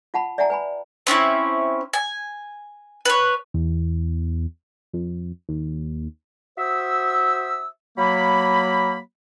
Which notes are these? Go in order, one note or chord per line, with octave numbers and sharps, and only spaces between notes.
F4 F#5 A5 B5
D5 E5 F#5 G#5 A#5
B4 G#5 B5
C4 C#4 D#4 E4
G#5
B4 C#5
E2
F2
D#2
F#4 C5 E5 D#6 E6
F#3 A#3 B5